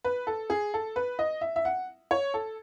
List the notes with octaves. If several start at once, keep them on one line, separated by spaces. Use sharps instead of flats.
B4
A4
G#4
A4
B4
D#5
E5
E5
F#5
C#5
A4